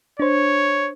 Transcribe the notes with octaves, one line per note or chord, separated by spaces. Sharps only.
D4 C5 C#5